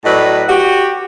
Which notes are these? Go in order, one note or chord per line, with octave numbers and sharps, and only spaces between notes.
A2 F#3 B4 D5 D#5
F#4 G4